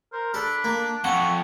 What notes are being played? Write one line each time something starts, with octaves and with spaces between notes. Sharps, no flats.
A#4 C5
D4 A4 B5
A#3
F2 F#5 C#6